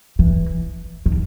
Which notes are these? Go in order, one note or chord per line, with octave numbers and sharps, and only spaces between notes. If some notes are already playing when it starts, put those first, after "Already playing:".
E3
D#3